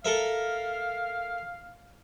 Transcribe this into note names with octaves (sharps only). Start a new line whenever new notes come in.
A4 A#4 E5 F5